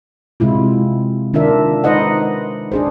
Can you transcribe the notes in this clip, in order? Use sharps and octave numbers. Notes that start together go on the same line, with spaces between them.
C3 G#3 E4 F4
D#3 D4 F4 A#4 E5
G#3 D#4 B4 C5 D#5 F#5
D4 G#4 C5